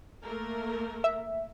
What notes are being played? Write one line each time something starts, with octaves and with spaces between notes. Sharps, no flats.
A3 A#3 A#4
E5